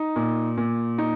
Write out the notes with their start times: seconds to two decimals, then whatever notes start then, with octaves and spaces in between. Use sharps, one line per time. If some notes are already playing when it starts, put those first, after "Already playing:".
Already playing: D#4
0.16 A#2
0.57 A#2
0.98 D#4